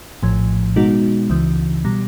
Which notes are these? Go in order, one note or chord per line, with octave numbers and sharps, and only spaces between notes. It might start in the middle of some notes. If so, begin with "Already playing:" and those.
A#1 A2 F3
B2 G#3 B3 D#4 F#4
C#2 C#3 E3
B2 G3